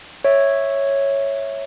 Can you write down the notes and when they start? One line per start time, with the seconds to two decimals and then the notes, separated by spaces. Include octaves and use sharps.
0.25 C#5 E5